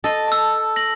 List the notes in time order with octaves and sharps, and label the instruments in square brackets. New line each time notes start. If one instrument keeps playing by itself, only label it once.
[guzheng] A4 D#5
[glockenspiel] A5 E6
A#6 F#7